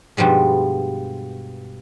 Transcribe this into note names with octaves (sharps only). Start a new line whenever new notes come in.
G2 B2 F3 G3 G#3